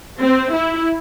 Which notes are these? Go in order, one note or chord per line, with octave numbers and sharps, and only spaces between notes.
C4
E4